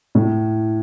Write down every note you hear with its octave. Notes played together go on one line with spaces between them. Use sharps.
A2